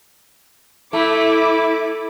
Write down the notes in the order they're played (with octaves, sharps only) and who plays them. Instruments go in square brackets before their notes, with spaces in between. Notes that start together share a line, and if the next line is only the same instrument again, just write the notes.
[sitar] A3 [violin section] E4 D6